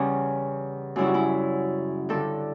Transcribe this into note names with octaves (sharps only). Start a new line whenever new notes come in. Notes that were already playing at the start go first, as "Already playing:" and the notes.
Already playing: E2 C#3 G3 C#4
F#2 C#3 G3 E4
F#4
E4
G2 D3 G3 A4